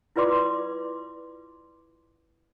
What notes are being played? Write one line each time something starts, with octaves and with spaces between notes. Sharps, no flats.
E4 F4 B4 D5 C6 D6